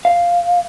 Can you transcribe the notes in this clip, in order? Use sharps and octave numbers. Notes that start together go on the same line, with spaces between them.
F5